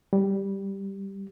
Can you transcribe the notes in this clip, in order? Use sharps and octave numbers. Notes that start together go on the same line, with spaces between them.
G3